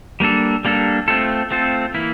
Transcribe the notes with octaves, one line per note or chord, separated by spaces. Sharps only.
G3 A#3 D4 A4
G3 A#3 D4 A4
A3 C4 F4 A4
A3 C4 F4 A4
E3 A#3 E4